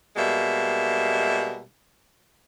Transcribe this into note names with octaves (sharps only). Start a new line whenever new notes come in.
B2 G3 G#3 A#3 E5